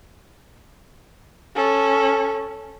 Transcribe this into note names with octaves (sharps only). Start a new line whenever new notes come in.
C#4 A4